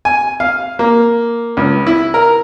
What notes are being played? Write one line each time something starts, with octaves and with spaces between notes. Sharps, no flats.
G#5
F5
A#3
C#2
E4
A#4